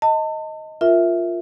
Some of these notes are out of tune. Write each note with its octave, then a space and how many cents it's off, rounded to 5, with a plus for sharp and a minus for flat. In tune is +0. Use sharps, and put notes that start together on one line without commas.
D#5 +10 A5 +35
F4 +0 A#4 +0 E5 +0